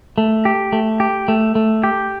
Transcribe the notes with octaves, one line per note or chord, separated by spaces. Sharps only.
A3
G4
A3
G4
A3
A3
G4